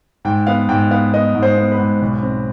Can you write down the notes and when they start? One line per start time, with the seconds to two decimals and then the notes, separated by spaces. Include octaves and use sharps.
0.25 G#2 G5
0.47 B3 F5
0.69 G#2 G5
0.91 B3 F5
1.14 B3 D#5
1.35 G#2
1.43 C5
1.58 B3
1.72 B4
1.79 G#2
2.02 B1
2.23 C4